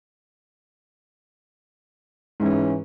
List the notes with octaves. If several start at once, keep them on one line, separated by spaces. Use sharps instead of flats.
G#2 E3 C#4